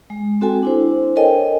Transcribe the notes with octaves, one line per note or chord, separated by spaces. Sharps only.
G#3
C4 F#4 A4 G5 G#5
D4 E4 C5
A4 A#4 C#5 D#5 G5 G#5